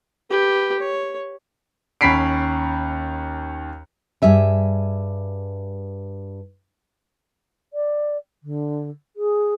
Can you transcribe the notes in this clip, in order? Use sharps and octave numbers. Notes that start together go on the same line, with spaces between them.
G4 B4
C#5
D#2 C#4 B5 B6 C7 D7
G2 G3 G#4 E5 G#5
D5
D3
G#4